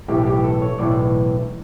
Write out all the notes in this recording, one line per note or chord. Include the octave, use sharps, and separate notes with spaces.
B1 A2 E3 G4
G4
A4
C#5
B1 A2 E3 D5